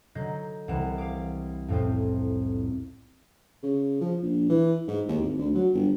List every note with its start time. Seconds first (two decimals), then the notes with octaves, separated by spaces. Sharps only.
0.15 D3 F#3 D#4 D#5 G6 C7
0.68 C2 E3 F#5 E7
0.98 F5 D6
1.68 F2 A2 F3 C4
3.63 C#3
4.01 F3
4.22 A#1
4.49 E3
4.88 G#2
5.08 D#2
5.22 G#1
5.38 D2
5.55 F#3
5.73 G1